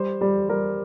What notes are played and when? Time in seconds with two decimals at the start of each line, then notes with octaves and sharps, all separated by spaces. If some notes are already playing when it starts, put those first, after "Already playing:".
Already playing: G3 C5
0.21 G3
0.49 G3 A#4